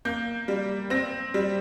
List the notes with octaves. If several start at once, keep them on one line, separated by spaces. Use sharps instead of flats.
A#3 G6
G3
C4 A#6
G3